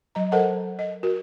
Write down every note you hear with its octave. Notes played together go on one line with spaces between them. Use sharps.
F#3 D#5 A#5
A4 A#4 C5 D#5 F#5 A5
D#5
F#4 A#4